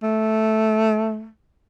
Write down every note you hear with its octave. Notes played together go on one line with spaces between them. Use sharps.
A3